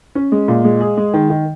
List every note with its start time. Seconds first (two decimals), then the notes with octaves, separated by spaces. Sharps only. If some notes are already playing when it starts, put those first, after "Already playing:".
0.15 C#4
0.32 G#3
0.48 A#2
0.64 G#3
0.81 G#4
0.97 G#3
1.14 D#3
1.30 D#3